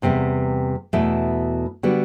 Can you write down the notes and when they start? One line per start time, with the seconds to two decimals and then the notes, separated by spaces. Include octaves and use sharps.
0.02 E2 C3 G3 B3
0.93 E2 B2 A3 E4
1.83 D3 G3 B3 F#4